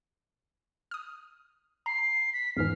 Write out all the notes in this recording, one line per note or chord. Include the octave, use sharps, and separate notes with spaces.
D#6 F6
A#5 C7
B6
E2 G#2 E3 F6